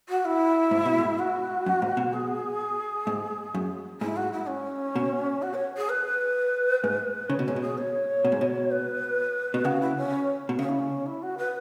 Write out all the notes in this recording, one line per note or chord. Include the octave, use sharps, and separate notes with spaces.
F#4
E4
G#2
B2
G#2
F#4
F#2
G#2
B2
G#4
G#2
F#2
G#2 E4
F#4
E4
C#4
B2
F#4
C#5
G#4
B4
G#2
C#3 C#5
B2
G#2 C#5
B2 G#4
C#5
B2
G#2
B2
B4
B2
C#3 F#4
E4
C#4
B2
C#3 C#4
E4
C#4
E4
F#4
B4